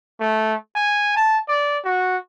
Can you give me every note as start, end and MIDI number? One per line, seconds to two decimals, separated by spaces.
0.20 0.54 57
0.75 1.12 80
1.16 1.38 81
1.48 1.78 74
1.85 2.17 66